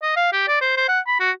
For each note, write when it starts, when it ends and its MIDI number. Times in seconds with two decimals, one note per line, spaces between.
0.02 0.14 75
0.16 0.32 77
0.33 0.44 67
0.48 0.60 74
0.61 0.73 72
0.77 0.87 72
0.89 1.00 78
1.07 1.17 83
1.20 1.31 66